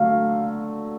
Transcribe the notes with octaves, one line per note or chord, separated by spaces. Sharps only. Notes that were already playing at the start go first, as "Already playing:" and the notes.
Already playing: D3 F#3 A3 F5